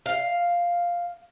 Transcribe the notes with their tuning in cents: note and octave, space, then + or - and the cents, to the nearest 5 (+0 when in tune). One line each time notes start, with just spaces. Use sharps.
F5 +0